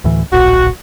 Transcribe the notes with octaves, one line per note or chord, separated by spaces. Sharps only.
D2 A2 E3
D1 A#1 F#4